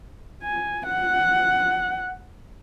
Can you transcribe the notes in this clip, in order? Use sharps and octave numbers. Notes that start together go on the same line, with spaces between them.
G#5
F#5